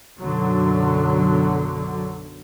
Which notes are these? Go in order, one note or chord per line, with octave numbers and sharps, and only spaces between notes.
B1 F#2 D3 F#3